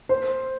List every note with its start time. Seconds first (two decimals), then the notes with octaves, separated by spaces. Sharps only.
0.09 C5